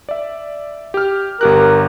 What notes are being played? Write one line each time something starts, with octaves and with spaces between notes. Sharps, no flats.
D5 E5
G4 F6
G1 G4 A#4 F#6